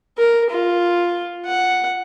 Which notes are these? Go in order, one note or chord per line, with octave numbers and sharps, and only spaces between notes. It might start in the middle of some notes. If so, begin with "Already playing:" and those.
A#4
F4
F#5